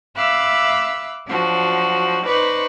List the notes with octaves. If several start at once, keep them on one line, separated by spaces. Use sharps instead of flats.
E5 F5 B5 D6 E6 F#6
F3 F#3 D4 F#4
D#4 B4 C5 D5 C#6